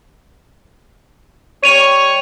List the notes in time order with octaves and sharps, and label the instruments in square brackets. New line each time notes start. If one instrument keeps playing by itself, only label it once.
[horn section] G3 C#5 [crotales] D#7 F7